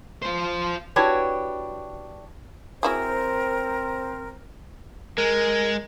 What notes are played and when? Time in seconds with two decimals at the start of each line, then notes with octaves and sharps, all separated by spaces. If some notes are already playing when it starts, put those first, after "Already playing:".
0.22 F4 C5
0.96 D4 E4 F#4 G4 B4 C#5
2.83 F#3 C4 E4 G#4 A#4 C5
5.18 G#3 A#4